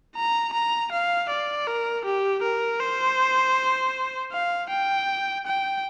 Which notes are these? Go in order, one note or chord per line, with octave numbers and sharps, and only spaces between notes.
A#5
A#5
F5
D5
A#4
G4
A#4
C5
F5
G5
G5